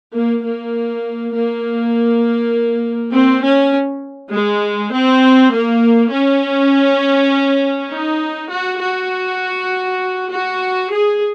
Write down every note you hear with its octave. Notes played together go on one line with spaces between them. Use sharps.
A#3
A#3
A#3
C4
C#4
G#3
C4
A#3
C#4
D#4
F#4
F#4
F#4
G#4